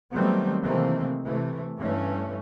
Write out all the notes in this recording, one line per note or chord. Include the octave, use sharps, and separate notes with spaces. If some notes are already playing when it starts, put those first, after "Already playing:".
D#3 F#3 G3 A3 B3 C4
C3 D#3 E3 A3 A#3 C4
C3 E3 A3
G2 E3 A3 C#4